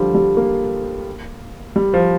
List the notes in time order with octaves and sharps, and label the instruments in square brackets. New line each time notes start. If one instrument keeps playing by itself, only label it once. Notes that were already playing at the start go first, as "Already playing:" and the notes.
Already playing: [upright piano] D3 F3 G3
G3
A#3
G3
F3